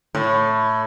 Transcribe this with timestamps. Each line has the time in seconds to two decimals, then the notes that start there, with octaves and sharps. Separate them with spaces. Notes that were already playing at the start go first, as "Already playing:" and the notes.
0.15 A2